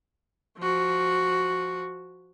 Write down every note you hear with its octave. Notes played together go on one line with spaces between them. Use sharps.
F3 F#4